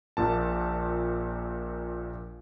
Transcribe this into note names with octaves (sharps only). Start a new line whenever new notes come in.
A#1 A#2 A5